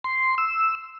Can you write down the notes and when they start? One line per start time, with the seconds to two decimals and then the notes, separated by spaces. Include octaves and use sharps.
0.04 C6
0.38 E6